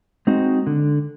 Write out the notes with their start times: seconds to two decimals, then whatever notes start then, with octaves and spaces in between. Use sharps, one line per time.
0.27 G#3 C4 D#4 F#4
0.67 D3